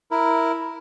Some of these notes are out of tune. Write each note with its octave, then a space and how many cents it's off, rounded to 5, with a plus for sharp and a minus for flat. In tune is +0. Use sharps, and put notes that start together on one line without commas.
E4 +0 A#4 +0